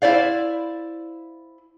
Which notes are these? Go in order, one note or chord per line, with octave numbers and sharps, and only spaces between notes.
E4 C5 D5 F5